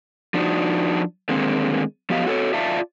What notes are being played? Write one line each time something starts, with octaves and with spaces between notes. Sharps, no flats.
F3 D4 D#4 F#4
D3 D#3 G#3 A#3 C4
F3 F#3 B3 G4 D#5 F5
F#4 A4 C5 C#5
F4 D5 E5 F5 A5